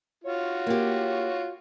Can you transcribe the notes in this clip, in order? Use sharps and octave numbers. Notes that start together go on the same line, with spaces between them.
F4 F#4 C#5
A#3 G4